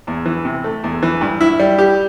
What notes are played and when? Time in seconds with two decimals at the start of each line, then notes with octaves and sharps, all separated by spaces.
0.07 E2
0.25 E3
0.45 C3
0.64 A3
0.84 E2
1.02 E3
1.21 G2
1.41 E4
1.59 G3
1.78 G4